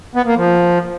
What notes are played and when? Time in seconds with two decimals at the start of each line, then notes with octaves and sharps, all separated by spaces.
0.15 B3
0.26 A#3
0.36 F3